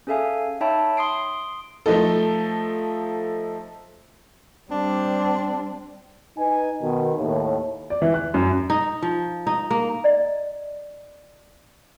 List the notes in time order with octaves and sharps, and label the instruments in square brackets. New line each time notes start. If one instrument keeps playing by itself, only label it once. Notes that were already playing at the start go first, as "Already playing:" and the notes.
[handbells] C#4 G#4 A4 E5 F5 G#5
D#4 C#5 E5 G5 A5 B5
C6 D#6 C7 D7
[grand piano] F3 A3 D#4 A4
[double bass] G3 C4 [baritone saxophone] D4
[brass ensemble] D#4 B4 G#5
B2 D#3
D#2 A2
[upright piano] D5
E3
F#6
F#2
[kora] D#4
F3
D#4
A#3
[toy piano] D5 D#5